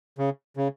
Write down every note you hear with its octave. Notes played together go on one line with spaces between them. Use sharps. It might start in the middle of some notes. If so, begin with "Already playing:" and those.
C#3
C#3